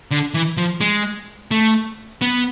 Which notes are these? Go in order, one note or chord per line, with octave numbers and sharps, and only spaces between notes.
D3
E3
F3
G#3
A3
B3